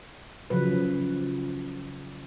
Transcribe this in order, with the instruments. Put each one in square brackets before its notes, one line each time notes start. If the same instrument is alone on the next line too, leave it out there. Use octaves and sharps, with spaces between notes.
[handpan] C#3 F3 F#3 B4